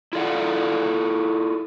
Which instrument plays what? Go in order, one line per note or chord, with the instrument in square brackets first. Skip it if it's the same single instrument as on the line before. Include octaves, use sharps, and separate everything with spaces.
[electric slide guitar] E4 F4 A4 D5 F5 F#5